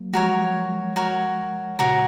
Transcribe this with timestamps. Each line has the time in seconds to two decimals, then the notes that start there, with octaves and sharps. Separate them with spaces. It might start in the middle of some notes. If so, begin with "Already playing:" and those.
Already playing: F#3 A#3
0.13 F3 G#3 F#4 A#4 C#5
0.96 F#4 A#4 C#5
1.79 A#2 C#3 F#4 A#4 C#5